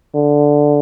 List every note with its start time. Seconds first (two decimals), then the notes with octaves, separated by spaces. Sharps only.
0.15 D3